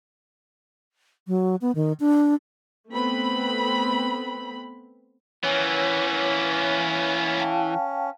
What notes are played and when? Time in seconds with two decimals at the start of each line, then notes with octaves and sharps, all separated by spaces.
1.27 F#3
1.61 B3
1.75 D#3
2.00 D4
2.90 A3 B3 C4 B5
5.44 E3 A#3 B3 C#4 C#5
7.40 F5 G5 A5